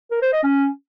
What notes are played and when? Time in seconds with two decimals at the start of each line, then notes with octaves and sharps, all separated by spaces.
0.11 A#4
0.22 C5
0.33 D#5
0.43 C#4